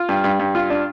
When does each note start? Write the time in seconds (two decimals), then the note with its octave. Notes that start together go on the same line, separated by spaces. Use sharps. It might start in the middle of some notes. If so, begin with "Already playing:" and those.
Already playing: F4
0.09 G2
0.24 G2
0.40 G2
0.55 F4
0.70 D4